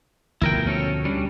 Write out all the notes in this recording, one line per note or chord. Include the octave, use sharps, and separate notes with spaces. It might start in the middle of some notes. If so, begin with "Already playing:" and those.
D2 B2 F3 E4 A#4 G5
C#4 A4 C#5
G3 C#4 D4